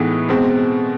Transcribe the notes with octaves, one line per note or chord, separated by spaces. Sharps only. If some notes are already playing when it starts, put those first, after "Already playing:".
Already playing: A2 E3 G#3 B3 D#4
B2 G#3 C4